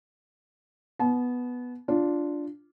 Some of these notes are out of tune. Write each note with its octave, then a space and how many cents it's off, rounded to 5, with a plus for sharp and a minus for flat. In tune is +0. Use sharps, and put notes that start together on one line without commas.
B3 +0 A5 -40
D4 -5 F4 -5